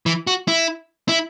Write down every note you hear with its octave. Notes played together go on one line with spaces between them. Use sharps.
E3
F#4
E4
E4